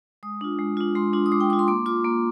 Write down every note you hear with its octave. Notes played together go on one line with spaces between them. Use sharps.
G#3 D#6
D4 F4
G#3
D4 F4
G#3 C6
D4 F4
D#6
G#3 D6
G5
D4 F4 D6
C6
A#3 D6
F4 D6
A#3